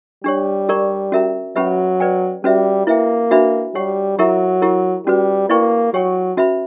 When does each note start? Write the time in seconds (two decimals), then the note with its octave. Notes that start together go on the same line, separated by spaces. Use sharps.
0.24 G3 D4 G4 C#5
0.69 G4 A#4 D5 A#5 C#6
1.12 C#4 F#4 A#4 E5 A#5
1.56 F#3 C#4 G4 B4 E5 B5
2.00 B4 D5 G5
2.44 G3 C#4 F#4 B4 E5
2.87 A#3 E4 B4 E5 G5
3.31 D4 F#4 B4 E5 B5
3.75 G3 G4 C#5 F#5
4.18 F#3 E4 G4 A#4 E5 A#5
4.62 E4 G4 A#4
5.06 G3 C#4 F#4 B4
5.49 A#3 E4 B4 D5 G5 C#6
5.93 F#3 G4 C#5 G5 C#6
6.37 C#4 F#4 B4 E5 B5